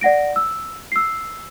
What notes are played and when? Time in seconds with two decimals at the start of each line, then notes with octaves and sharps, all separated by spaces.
0.01 D5 F#5 A#6 D7
0.36 E6
0.92 E6 C7